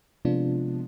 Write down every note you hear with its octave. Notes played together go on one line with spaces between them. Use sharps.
C3 F3 G#3 B3 D4 F4